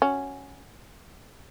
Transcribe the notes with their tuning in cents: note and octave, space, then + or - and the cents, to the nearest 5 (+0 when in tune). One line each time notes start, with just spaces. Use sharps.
C#4 +0 F#4 +0